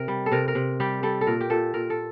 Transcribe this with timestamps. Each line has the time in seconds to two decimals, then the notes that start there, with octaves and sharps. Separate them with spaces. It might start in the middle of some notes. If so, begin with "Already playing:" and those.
Already playing: C3 A#4
0.08 G3
0.26 A4
0.32 C3 A#4
0.48 A#4
0.55 C3
0.80 G3 G4
1.03 G3 A4
1.21 A4
1.27 A#2 A#4
1.41 G4
1.50 A#2 A4
1.74 A#2 A#4
1.90 A4